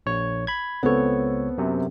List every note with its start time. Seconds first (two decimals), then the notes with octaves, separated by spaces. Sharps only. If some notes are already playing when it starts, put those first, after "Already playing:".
0.06 A#1 C#5
0.47 B5 G#6
0.83 C#2 B3 C4 A4 C#5
1.58 F#2 C3